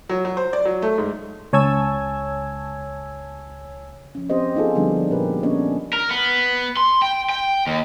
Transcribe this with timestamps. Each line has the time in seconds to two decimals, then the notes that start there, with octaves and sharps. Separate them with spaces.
0.09 F#3
0.25 F#3
0.37 C5
0.53 D5
0.65 F#3
0.82 A3
0.98 G#2
1.53 C#2 C#5 G#5 A5 E6 G#6
4.15 F3 C#4
4.30 C4 C#4 G4 C5 D#5
4.55 B3 D#4 F4 G#4 A4
4.75 D3 F3 G3 B3 D4
5.11 A#2 G4 A#4 B4
5.43 B3 C#4 D4 C#5 D#5
5.93 A#4
6.10 B3
6.77 C6
7.02 G5
7.30 G5
7.67 D#2